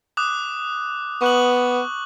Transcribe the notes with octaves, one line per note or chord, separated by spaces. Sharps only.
D6 D#6 F#6
B3 C#6 F#6 F#7